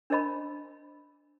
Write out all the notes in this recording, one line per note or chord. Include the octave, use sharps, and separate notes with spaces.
D4 A#4 C5 D#5 A5 B5